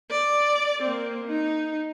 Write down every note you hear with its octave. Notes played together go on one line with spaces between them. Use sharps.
D5
A#3 C4
D#4